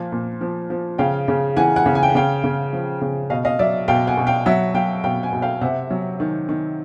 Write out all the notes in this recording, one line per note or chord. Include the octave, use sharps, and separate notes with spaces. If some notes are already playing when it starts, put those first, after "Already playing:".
Already playing: A#2 F3
A#2
F3
F3
C#3 F5 G5
C#3
E3 F#5 G#5
F#5 G#5
C#3
G#5
G5
F#5
C#3 F5 G5
C#3
F3
C#3
B2 D#5 F5
D#5 F5
F#3 D5 E5
B2 F5 G5
F#5 G#5
B2
F5 G5
F#3 E5 F#5
F#3 F5 G5
B2 F5 G5
F#5 G#5
B2
F5 G5
C3 E5 F#5
F#3
D#3
D#3